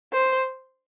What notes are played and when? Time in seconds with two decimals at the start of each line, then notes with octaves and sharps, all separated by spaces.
0.13 C5